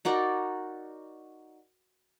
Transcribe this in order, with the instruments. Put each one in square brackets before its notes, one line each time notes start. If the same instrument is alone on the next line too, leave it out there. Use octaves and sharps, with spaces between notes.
[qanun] D#4 F#4 A#4 D5